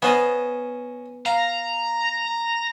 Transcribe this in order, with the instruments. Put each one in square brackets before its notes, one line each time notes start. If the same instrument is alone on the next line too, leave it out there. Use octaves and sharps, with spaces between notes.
[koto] B3 [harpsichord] C#4 C5 D#5
[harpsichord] F5 [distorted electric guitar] A#5